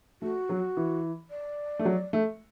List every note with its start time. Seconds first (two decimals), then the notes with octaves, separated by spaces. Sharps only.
0.22 A3 F#4
0.49 F#3
0.77 E3
1.30 D5
1.79 A3
1.85 F#3
2.13 A3